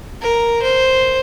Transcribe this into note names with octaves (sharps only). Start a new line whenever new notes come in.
A#4
C5